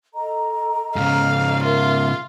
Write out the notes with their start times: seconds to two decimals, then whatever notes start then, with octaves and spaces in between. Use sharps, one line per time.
0.14 A4 D#5 A#5
0.96 G#2 C#3 F5
1.63 F4 A#4 E5